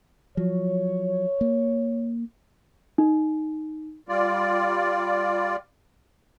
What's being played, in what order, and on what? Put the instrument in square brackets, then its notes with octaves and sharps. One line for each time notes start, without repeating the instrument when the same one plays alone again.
[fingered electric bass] F3 F#3 [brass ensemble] C#5
[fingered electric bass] A#3
[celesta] D#4
[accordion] G3 F4 D5